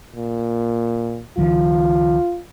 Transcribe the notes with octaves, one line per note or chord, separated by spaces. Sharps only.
A#2
C#2 D#3 F3 F4